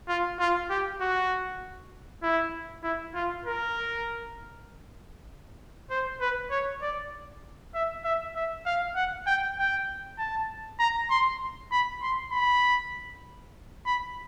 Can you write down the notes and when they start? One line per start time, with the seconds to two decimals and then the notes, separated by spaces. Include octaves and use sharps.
0.08 F4
0.40 F4
0.70 G4
1.00 F#4
2.23 E4
2.83 E4
3.15 F4
3.45 A#4
5.90 C5
6.21 B4
6.51 C#5
6.82 D5
7.74 E5
8.04 E5
8.35 E5
8.66 F5
8.96 F#5
9.27 G5
9.58 G5
10.18 A5
10.79 A#5
11.10 C6
11.71 B5
12.02 C6
12.32 B5
13.86 B5